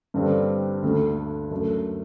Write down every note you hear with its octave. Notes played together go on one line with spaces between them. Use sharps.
G2 D3 G3 C4
D2 D3 A3
F#2 D3 A3